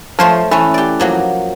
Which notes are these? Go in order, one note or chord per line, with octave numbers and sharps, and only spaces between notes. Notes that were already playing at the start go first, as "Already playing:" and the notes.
F3 A3 C5 C#5
E3 A3 C#4
G4 D5
F3 F#3 A#3